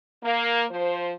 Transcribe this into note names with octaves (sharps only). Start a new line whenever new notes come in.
A#3
F3 C5